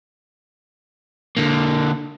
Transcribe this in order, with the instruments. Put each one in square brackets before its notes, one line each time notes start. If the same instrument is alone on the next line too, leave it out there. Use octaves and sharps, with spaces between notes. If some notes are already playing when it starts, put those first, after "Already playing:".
[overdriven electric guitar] D3 A#3